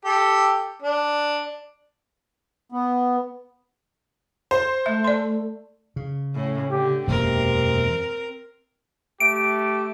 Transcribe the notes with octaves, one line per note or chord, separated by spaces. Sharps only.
G4 A4
D4
B3
C5
A3 E5
D5 C6
C#3
A2 C#4
D3 G4
E1 F#2 C3 A#3 C4 A#4
A3 G4 D7